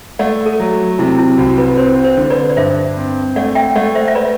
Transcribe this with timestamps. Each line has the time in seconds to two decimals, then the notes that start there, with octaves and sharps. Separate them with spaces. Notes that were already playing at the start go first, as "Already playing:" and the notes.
0.19 A3 D5 F#5
0.46 A4
0.60 F#3
0.99 C3 E4
1.18 E4
1.38 C2 F#4
1.58 B4
1.77 C4 C5
2.04 C5
2.17 D3
2.30 B4 D5
2.50 D5
2.57 G2 C5 E5
2.97 C4
3.36 A3 D5 F#5
3.55 E5 G5
3.75 A3 D5 F#5
3.95 C5 E5
4.08 E5
4.15 B4 D5